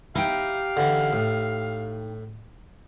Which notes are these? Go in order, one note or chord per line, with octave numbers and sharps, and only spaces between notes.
D#4 E4 G4 F5 G5
D3 E3
A2